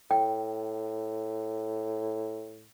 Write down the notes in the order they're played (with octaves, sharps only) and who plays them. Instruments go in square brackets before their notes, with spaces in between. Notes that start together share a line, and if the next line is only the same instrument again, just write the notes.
[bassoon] A2 [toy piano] G5